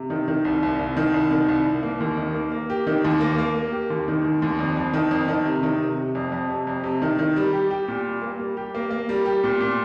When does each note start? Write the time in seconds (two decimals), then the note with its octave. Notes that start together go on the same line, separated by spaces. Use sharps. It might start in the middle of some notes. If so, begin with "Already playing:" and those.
Already playing: C3
0.10 D#3
0.28 D#3
0.45 C2
0.63 C2
0.79 C2
0.97 D#3
1.14 C2
1.31 D#3
1.48 C2
1.66 C2
1.83 A#3
2.00 D#2
2.17 D#3
2.34 A#3
2.52 A#3
2.70 G4
2.87 D#3
3.04 D#2
3.21 A#3
3.38 A#3
3.55 A#3
3.72 G4
3.90 D#2
4.08 D#3
4.24 D#2
4.42 D#2
4.59 F2
4.77 F2
4.93 D#3
5.11 F2
5.28 D#3
5.45 C3
5.63 D#3
5.80 C3
5.97 C3
6.15 F2
6.32 F2
6.50 C3
6.67 F2
6.84 C3
7.02 D#3
7.19 D#3
7.36 G3
7.53 G4
7.71 G4
7.88 A#2
8.04 G3
8.22 A#3
8.39 G3
8.57 G4
8.75 A#3
8.91 A#3
9.09 G3
9.25 G4
9.44 A#2
9.61 A#2